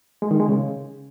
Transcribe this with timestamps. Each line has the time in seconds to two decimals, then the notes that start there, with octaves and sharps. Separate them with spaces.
0.22 G#3
0.31 D#3
0.40 G#3
0.48 C#3